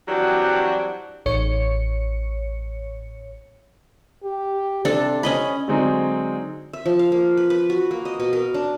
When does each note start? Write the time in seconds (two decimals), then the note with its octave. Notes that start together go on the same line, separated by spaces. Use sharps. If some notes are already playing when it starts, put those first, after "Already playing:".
0.08 E3 F#3 G3 C4 D4 F#4
1.26 A1 C#5 C#7
4.24 G4
4.85 C3 D4 A4
5.23 C#4 D#5 B5
5.68 D3 F#3 G#3 C4 D#4
6.73 E5
6.86 F3
6.99 F5
7.12 A#3
7.37 B4
7.50 B4
7.70 F#4
7.91 A#3
8.05 D#5
8.20 B2
8.33 A#4
8.54 D4